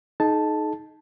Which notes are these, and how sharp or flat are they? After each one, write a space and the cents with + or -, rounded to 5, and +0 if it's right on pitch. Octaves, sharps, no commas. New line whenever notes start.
D#4 +0 G#4 +45 A5 +0